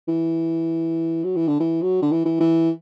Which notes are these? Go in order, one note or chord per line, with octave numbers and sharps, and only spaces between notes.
E3
F#3
E3
D3
E3
F#3
D3
E3
E3
E3